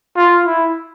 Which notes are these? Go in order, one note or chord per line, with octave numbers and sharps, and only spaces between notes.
F4
E4